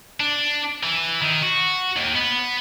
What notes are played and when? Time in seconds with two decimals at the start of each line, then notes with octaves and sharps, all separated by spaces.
0.20 D4
0.83 E3
1.22 D#3
1.43 F#4
1.97 D#2
2.15 B3